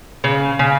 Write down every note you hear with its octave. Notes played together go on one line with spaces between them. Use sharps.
C#3
C#3